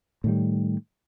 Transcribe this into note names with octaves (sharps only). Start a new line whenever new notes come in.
A2 D#3 G3